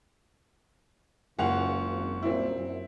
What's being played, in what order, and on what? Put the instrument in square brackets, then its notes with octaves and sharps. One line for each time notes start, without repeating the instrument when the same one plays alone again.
[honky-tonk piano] F#1 F#5 F7 [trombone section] C#2 F#2 F4
[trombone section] G#1
[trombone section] C2 F#2 A#2 [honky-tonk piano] C4 E4
[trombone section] F#2